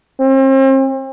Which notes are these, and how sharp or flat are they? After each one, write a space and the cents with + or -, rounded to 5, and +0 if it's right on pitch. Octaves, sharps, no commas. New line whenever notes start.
C4 +40